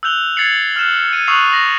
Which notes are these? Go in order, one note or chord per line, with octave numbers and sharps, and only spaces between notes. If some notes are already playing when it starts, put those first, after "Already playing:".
E6 F#6 G6 F7 G7
G#6 A6 C7 C#7 F#7
F6 F#6 E7 F#7
G#6 D#7
C#6 D#6 E6 F#6 C7 F7
A#6